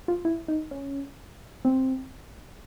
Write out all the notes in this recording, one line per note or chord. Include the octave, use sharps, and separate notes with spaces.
F4
E4
D#4
C#4
C4